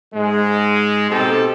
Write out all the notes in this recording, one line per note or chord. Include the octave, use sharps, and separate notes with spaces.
G#2 G#3
B2 C4 D#4 G4 A4